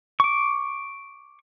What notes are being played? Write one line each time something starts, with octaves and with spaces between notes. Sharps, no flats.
C#6 D6